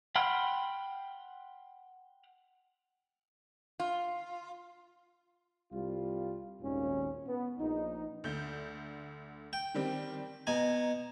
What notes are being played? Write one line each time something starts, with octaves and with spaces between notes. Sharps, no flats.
F#5 G5 B5 C6 F6
F4
C2 G3 F4
G#1 D#2 A#2 C#4
B3
A#1 D#4
D2 D3 G6
G5
D#3 G3 C4
B2 G#5 A#5